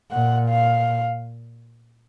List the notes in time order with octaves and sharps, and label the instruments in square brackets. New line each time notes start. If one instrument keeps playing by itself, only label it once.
[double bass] A#2 [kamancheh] F#5
[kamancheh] F5